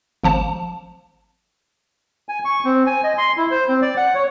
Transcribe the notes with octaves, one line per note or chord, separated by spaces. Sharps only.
G#1 F3 A5 E7
G#5
C#6
C4
G#5
D#5
C6
E4
C5
C4
D5
F#5
C#5